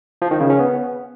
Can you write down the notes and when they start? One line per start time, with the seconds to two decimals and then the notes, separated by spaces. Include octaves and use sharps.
0.22 F3
0.31 D#3
0.40 C#3
0.50 C#4
0.59 B3